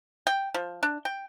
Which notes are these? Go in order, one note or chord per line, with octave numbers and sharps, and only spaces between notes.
G5
F3
D4
G5